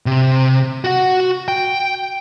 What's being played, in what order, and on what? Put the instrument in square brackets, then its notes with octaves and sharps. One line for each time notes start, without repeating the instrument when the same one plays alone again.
[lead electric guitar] C3
F#4 F#5
G5